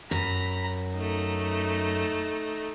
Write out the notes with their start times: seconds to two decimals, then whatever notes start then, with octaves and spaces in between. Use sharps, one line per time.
0.11 F#2 A#5 B5
0.95 A3 D#4